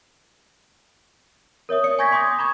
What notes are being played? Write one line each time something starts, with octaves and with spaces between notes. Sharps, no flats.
A#4 C#5 E5 D#6
D5 C#7
G#5 C#6 G6 G#6 A#6 B6
G#5 C6 D6 D#6 G6 G#6
D#6
A#5 B5 C#6 D6 G#6